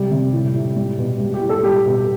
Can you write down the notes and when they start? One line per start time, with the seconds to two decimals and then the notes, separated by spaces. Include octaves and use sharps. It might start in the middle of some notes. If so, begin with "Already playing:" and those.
Already playing: C3 G3
0.11 C3
0.32 A2
0.54 A2
0.76 G3
0.98 B2
1.20 G3
1.34 G4
1.41 A2
1.49 A4
1.63 G3 G4
1.86 B2